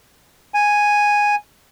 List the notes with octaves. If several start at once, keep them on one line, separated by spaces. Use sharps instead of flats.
G#5